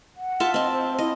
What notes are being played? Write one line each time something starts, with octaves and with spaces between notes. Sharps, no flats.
F#5
F4 E5 A5
C4 D#5 A5
C5
E4 D#5